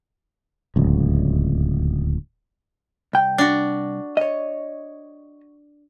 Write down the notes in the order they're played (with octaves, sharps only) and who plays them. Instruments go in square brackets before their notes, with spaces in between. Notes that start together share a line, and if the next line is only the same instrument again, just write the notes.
[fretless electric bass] D1 C#2
[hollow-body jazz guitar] C2 G5
[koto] D4 F#4
[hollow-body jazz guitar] C#5 D#5